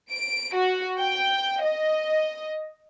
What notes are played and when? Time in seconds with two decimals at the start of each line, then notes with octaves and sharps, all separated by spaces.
0.11 D7
0.55 F#4
0.99 G5
1.63 D#5